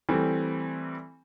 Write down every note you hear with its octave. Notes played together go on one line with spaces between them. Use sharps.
E3 G3 A3 C4